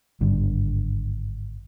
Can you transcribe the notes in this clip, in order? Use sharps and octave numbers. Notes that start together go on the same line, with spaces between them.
G#1 G2 D3